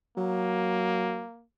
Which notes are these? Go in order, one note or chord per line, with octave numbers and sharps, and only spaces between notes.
F#3 A#3